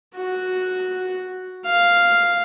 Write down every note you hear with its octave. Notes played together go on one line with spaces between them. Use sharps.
F#4
F5